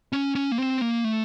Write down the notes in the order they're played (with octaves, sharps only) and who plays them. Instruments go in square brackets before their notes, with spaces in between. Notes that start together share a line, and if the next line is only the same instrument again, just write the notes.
[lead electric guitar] C#4
C#4
A#3
C4
A#3
A3